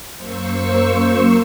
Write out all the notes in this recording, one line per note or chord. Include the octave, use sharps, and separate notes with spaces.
F#2 A#3 C5 C#6 E6